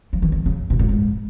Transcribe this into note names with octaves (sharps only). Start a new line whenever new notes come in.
F3
E3
D#3
C#3
B2
A2
G#2